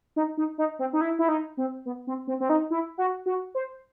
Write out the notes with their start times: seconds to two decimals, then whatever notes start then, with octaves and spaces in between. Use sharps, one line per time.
0.16 D#4
0.37 D#4
0.58 D#4
0.79 C4
0.93 D#4
1.01 E4
1.19 E4
1.29 D#4
1.57 C4
1.85 B3
2.07 C4
2.27 C4
2.40 C4
2.49 D#4
2.70 E4
2.98 F#4
3.26 F#4
3.55 C5